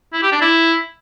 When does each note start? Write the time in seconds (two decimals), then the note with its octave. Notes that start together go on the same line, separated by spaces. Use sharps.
0.13 E4
0.23 G4
0.32 D4
0.42 E4